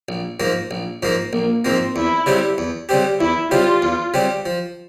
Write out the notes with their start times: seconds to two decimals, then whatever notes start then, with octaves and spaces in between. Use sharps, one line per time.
0.09 A#1
0.40 G#2 F3 A#3
0.71 A#1
1.03 G#2 F3 A#3
1.33 A#1 A#3
1.65 G#2 F3 A#3 C4
1.96 E2 E4
2.26 C#3 G3 C4 G4
2.58 E2
2.89 C#3 G3 C4 G4
3.20 E2 E4
3.51 C#3 G3 C4 F4 G4
3.82 E2
4.14 C#3 G3 C4 G4
4.46 F3